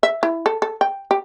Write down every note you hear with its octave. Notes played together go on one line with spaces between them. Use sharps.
E5
E4
A4
A4
G5
G4